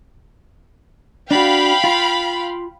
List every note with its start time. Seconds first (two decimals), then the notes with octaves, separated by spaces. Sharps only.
1.31 D4 F#4 F5 G5 B5
1.84 F4